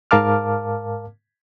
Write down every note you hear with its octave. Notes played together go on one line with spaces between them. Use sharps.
G#2 A#4 F5 A5 D6 F6